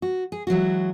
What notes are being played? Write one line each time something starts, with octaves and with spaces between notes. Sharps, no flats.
F#4
G#4
E3 F#3 G#3 F#4